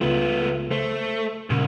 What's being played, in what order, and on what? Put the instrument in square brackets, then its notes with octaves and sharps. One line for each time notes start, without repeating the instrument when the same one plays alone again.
[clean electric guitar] C#2 F4 [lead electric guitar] A3 B3
[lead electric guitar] A3 [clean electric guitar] C5
[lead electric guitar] C2 [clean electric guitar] A#2 C#3 A#4